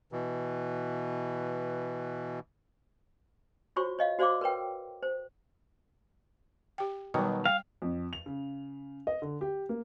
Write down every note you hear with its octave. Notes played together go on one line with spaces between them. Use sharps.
B2 E3
F4 F#4 C5 C#5 C#6
C#5 D#5 F5
F#4 C5 D5 F5 C6 D6
A#4 B4 C#5 G5
C5
G4 G5
B2 D#3 F#3 G3 G5
F5 G5
F2
F7
C#3
D#5
D3
G4
A#3